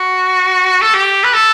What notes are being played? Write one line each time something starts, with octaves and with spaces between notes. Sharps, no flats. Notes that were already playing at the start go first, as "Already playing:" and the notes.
Already playing: F#4
A4
G4
B4
A4